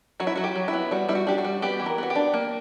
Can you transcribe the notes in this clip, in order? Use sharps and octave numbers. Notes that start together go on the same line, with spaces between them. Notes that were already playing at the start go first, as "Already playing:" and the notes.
F#3 F#4
E4
F#3 F#4
G4
F#3
E4
B3
G3 F#4
G3 E4
F#4
D4 G4
F#4
G3
B3 G4
E3
A#4
B3 F#4
G4
D4
A#3